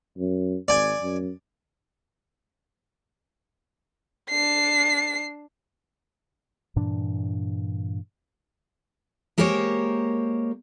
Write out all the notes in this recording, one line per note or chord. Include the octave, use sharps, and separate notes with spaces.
F#2
G#1 D5 G#5
F#2
D4 C7
G2 A#2 E3 D4
G#3 A#3 G4 A#4 C5 C#5